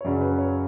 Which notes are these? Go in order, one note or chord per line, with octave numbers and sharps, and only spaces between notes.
C#5
F#2 C#3 F#3 C#4 D5
B4
C#5